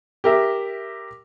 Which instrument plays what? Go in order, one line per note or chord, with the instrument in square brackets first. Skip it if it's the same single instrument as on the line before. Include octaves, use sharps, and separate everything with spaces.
[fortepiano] G4 A#4 E5